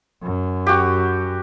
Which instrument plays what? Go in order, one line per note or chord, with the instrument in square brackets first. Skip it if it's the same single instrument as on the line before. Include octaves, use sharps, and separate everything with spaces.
[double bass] F#2
[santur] F#4 G4